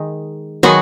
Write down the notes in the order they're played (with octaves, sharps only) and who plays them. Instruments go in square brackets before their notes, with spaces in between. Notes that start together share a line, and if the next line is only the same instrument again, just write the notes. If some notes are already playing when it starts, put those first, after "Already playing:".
Already playing: [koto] D#3 G#3 D#4
[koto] D#3 G#3 B3 D#4 G#4 [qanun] F#3 F#4